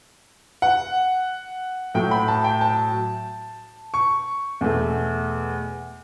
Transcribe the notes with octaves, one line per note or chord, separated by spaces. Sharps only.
F#5
A2 F#3 A3 G5
B5
A5
G5
A5
C#6
E2 B2 A3